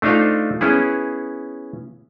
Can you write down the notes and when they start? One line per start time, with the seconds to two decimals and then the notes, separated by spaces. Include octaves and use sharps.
0.02 A3 D4 D#4 F4 C5 F5
0.61 B3 C#4 E4 G#4